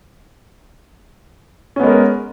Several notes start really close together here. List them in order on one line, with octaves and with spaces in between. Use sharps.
C#4 B3 G#3 A#4